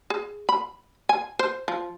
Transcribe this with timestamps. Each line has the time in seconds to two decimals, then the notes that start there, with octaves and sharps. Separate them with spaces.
0.10 G#4
0.49 B5
1.09 G#5
1.39 C5
1.68 F3